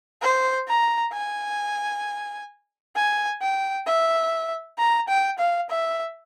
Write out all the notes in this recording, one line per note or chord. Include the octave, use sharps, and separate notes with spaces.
C5
A#5
G#5
G#5
G5
E5
A#5
G5
F5
E5